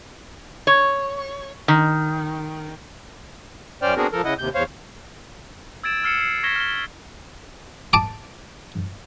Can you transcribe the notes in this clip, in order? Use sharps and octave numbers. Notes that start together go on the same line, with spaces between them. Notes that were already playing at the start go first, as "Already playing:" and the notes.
C#5
D#3
F#2 C#4 C5 D5 G5 F6
B3 C4 D4 F#4 G#4 A#4
F3 A4 A#4
C#3 E4 D#5 F#5
D#2 C3 G6
E2 C5 C#5 F5
E6 G#6 A6 D7 E7
E6 F6 C7 C#7 E7
C7
C#6 G#6 A#6 B6 E7 G7
F6 G7
A5 D6 D#6